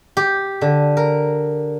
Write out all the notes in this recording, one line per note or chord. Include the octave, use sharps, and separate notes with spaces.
G4
D3
A#4